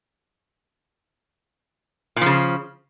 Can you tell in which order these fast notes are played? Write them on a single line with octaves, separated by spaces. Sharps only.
A#2 F3 C#3